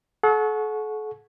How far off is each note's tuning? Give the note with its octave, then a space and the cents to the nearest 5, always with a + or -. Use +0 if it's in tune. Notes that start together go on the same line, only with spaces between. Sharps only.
A4 -40 F#5 -20 C#6 +0